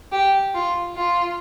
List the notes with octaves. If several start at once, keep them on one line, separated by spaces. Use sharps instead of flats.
G4
F4
F4